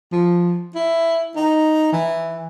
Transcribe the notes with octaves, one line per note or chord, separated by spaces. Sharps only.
F3
E4
D#4
E3